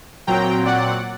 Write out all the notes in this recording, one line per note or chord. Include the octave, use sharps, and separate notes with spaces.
A#2 F#3 C4 G5 A#5
D5 F#5